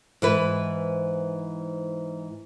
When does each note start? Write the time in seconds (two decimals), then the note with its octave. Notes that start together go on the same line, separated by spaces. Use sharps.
0.22 G#2 E3 B4